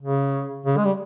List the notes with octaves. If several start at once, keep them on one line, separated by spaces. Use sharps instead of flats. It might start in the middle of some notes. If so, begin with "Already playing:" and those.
C#3
C#3
G#3
G3